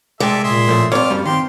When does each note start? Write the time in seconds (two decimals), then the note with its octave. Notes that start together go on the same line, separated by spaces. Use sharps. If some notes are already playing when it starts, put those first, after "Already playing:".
0.20 C2 G#3 A4 D5 E5 G5
0.44 A#2 G#4 E5 C6
0.67 A2 F3 A3
0.92 D2 G2 C4 F4 C#5 D6 F6
1.10 F#2 G3
1.26 D#3 C4 G4 C6